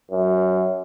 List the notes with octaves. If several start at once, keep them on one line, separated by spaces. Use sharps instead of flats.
F#2